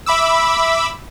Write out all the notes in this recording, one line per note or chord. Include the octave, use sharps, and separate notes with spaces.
E5 B5 D6 E6